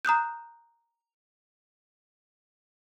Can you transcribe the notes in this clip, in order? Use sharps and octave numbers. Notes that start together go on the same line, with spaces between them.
A#5 D#6 F#6 G6